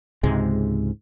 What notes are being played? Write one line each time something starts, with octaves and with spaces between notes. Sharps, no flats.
C#2 G#2 C3 G#3